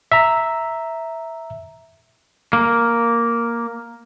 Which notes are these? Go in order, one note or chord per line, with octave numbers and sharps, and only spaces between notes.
E5 A#5
A#3